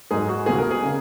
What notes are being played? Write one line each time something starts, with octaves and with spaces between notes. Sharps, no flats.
G#2 F#3 A#3 D#4 G#4
F#4
C#2 B2 A#3 D#4 G#4
A#4
G#4
C#3